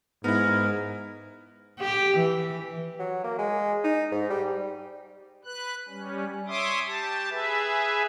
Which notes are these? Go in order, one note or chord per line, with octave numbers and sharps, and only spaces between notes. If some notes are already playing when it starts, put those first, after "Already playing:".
G#2 B3 E4 A#4
G4
E3
F#3
A#3
G#3
D#4
G#2
G3
B4 F#6
G3 C#4
C#5 E5 C6 D6 D#6
G4 A5
G#4 B4 E5